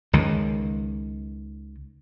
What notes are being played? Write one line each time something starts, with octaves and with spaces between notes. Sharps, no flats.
C#2 D#3